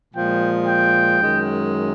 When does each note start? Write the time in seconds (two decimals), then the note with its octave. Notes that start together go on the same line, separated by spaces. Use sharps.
0.14 A#2 F3 G#3 G5
0.68 G5
1.21 F#2 D#3 G#3